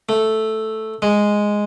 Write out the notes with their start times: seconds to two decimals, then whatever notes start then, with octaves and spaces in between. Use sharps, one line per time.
0.09 A3
1.02 G#3